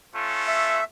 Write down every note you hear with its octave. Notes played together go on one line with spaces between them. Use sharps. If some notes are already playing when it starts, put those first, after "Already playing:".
A3 C#4 F4
E5